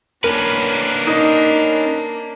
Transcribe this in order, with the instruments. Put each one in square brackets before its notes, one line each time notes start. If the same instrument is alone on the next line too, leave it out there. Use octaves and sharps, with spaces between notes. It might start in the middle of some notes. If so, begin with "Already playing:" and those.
[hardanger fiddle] A#3 D4 [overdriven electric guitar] C#4 B4 [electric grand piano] A#4
[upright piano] D#4 D#5